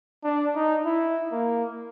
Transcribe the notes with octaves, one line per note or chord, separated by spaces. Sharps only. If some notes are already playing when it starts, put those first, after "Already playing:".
D4
D#4
E4
A#3